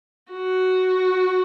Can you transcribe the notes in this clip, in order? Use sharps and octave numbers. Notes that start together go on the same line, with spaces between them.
F#4